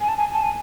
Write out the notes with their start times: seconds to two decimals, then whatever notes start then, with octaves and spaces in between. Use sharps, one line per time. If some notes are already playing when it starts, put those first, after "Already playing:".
0.01 G#5
0.08 A5
0.18 G#5
0.33 A5
0.43 G#5